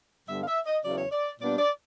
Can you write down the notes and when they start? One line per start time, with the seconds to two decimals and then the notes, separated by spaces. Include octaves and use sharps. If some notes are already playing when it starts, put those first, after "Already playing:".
0.28 G2 D3 G3 B3 E5
0.43 F5
0.47 E5
0.66 D#5
0.84 E2 C#3 F#3 D5
0.98 C#5
1.11 D5
1.40 A#2 G3 B3 D4 D5
1.59 D5